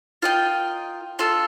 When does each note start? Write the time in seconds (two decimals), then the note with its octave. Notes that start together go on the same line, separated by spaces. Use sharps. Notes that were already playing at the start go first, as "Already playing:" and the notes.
0.22 F4 A#4 D#5 G5
1.19 D4 F4 A4